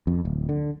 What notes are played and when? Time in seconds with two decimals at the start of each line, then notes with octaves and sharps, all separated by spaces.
0.07 F2
0.25 D1
0.49 D3